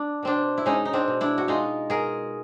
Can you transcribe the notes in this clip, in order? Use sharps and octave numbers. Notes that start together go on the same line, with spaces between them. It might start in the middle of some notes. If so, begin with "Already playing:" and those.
Already playing: D4
B2 C4 D4
E4
G#3 C#4 D#4
D#4
C4 D4
B2
D4 E4
F#4
G#3 D#4 F4
B2 G#4 A#4